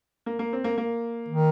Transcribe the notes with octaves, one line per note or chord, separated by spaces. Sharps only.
A#3
A#3
C4
A#3
A#3
D#3